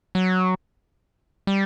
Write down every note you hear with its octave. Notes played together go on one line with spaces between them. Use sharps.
F#3
G3